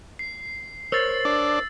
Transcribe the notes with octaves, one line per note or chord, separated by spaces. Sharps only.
C7
A#4 C5 C#5 E6 A6
D4